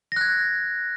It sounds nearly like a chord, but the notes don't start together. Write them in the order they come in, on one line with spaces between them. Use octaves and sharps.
A#6 F#6 G#6